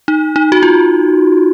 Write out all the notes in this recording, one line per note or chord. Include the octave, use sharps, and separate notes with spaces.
D#4
D#4
F#4
F4